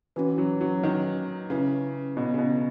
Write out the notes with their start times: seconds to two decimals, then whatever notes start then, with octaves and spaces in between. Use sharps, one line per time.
0.16 E3 C#4 F#4 B4
0.38 F#3
0.61 F#3
0.83 D#3
1.50 C#3 C#4 E4 B4
2.17 B2
2.34 C#3
2.39 B2